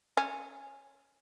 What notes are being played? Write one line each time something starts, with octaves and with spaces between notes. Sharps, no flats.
C#4